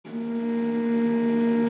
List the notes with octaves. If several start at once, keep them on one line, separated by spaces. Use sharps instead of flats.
A#3